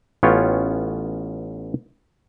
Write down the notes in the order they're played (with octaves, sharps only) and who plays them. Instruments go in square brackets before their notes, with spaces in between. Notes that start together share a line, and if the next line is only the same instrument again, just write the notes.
[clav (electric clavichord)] A1 B3 C#4 F4 C#5 G5